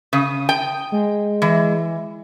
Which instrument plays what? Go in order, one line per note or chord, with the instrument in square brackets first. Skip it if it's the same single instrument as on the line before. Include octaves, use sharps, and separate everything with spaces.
[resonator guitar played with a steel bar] C#3 [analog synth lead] D#6
[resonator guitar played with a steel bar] G5
[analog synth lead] G#3
[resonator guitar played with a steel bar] E3